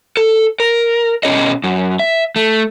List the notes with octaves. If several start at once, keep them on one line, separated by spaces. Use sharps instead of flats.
A4
A#4
B2 F#3 C#4 G#4 C#5 D#5
F#2
E5
A3